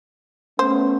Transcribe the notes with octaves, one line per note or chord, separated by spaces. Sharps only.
A3 B3 C#4 C5